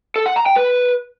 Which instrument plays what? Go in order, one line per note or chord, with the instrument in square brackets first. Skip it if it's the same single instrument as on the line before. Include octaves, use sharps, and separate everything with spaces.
[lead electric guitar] A4
F#5
A#5
G5
B4